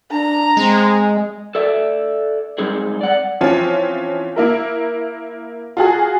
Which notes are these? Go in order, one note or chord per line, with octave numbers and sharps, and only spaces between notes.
D4 A#5
G#3 C4
A4 D5 E5
G3 G#3 C4 D#4 G#4
D5 F#5
E3 F3 C4 C#4 F4
A#3 E4 A#4
F4 F#4 G#4